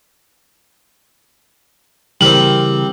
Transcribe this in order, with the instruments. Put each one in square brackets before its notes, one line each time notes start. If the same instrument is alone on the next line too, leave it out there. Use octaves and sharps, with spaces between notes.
[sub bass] C#3 [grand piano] E3 A#4 F6 [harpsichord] G3 C4 [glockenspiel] F#7